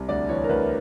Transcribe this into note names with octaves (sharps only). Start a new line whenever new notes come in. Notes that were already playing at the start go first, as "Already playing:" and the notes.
Already playing: C2
D2 D5
E3 C#5
A#4
D2 B4